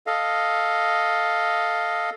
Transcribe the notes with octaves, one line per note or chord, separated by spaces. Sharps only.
A4 D#5 F5